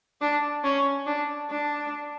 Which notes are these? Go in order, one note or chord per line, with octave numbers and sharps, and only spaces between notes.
D4
C#4
D4
D4